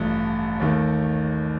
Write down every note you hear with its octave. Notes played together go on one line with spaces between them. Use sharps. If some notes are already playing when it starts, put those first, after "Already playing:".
Already playing: A1 G2 F3 A3
D#2 D#3 A3